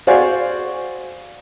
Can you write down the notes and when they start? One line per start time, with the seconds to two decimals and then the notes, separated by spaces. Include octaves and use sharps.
0.07 F#4 C5 D5 F5 G#5